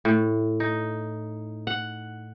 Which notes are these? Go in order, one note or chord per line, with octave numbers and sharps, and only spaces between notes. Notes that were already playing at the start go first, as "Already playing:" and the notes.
A2
D#4
F#5